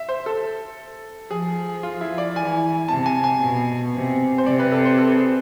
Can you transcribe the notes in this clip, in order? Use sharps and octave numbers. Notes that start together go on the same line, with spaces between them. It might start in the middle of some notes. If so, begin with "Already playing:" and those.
Already playing: E5
C5
A4
F3 G#4
F4
E4
D5
E3 G#5
C3 A5
G#5
G#5
B2
C3
C5
C3 D5
B4
A4
C5
A4
G#4